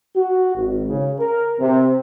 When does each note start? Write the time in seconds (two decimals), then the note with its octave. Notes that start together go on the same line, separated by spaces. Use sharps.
0.16 F#4
0.55 G#1
0.90 C#3
1.19 A#4
1.60 C3